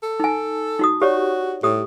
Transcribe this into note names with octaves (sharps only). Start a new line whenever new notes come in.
A4
D#4 G#5
D#4 F#4 D#6
F#4 G4 C#5 D5
A2 G4 D#6